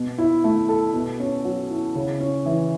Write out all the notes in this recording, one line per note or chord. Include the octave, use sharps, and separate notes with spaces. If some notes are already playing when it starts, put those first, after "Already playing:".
Already playing: B2
E4
A3
A4
B2
C#4
F#3
E4
C#3
C#4
E3